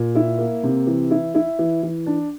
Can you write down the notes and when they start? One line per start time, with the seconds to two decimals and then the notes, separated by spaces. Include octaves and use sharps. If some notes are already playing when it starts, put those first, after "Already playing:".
Already playing: A#2
0.15 E4
0.39 A#3
0.63 C3
0.87 E3
1.11 E4
1.35 E4
1.59 E3
1.83 E3
2.06 D4